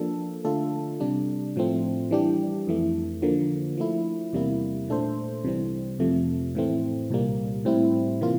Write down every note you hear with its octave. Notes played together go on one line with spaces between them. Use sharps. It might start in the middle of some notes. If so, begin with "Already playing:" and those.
Already playing: F3 A#3 D4 A4
D3 A3 D4 F4 A4
C3 G3 D4
A2 F3 A3 C4
E3 G3 D4 G4
F2 E3 A3
D3 F3 A#3
F3 A3 E4
E2 C3 G3 A#3 E4
A#2 A3 D4 A4 C5
C2 C3 E3 G3 C4
F2 C3 F3 A3
A2 E3 A3 C4
C2 A#2 G3 A#3
A2 G3 C4 E4
C3 E3 A#3 F4